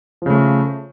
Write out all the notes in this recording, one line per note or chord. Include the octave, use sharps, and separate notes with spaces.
C#3 F3 A3